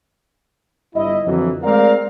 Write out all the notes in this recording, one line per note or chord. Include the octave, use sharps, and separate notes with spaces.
G1 E4 D#5
F2 D3 E3 F#3
G#3 A3 C4 A#4 D5 F5